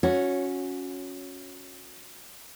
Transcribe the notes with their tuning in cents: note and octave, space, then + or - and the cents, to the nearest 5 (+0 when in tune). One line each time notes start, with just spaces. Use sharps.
C#4 +0 F#4 -25 C#5 +0